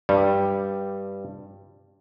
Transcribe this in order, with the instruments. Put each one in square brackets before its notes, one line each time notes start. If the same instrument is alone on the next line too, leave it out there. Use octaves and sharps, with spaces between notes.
[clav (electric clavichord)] G2 G3